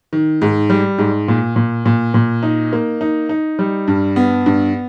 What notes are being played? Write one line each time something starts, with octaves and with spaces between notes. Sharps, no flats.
D#3
G#2
G3
G#2
A#2
A#2
A#2
A#2
D#4
A#3
D#4
D#4
G3
G2
B3
G2